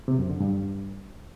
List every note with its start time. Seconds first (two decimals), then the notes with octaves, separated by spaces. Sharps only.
0.08 C3
0.19 F#2
0.30 D3
0.40 G2